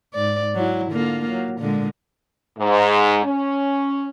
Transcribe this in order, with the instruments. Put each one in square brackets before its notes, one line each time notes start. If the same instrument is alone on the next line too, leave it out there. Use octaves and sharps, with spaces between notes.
[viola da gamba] G#2 D5
F#3 E4
D3 A#3 F4
F#3
A#2 D3 G#3
[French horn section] G#2
C#4